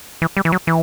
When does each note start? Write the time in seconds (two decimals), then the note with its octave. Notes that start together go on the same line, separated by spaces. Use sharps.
0.22 E3
0.37 G3
0.45 E3
0.52 F#3
0.67 E3